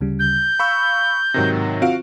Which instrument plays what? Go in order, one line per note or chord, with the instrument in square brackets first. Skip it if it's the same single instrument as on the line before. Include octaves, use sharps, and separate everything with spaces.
[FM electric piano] D2 C#3 G3
[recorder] G6
[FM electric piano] F5 [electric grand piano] B5 C#6 E6
[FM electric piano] G#2 A#6 [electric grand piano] C3 D#3 F#3
[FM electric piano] C4 F4 [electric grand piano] F#4 F5 D7